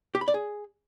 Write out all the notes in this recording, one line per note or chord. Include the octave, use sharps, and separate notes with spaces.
G4
B5
D5
G#4